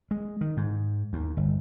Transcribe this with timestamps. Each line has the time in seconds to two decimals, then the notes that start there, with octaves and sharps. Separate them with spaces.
0.11 G#3
0.41 D#3
0.57 G#2
1.13 D#2
1.37 G1